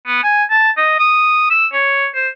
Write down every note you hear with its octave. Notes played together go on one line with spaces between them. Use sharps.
B3
G#5
A5
D#5
D#6
E6
C#5
C5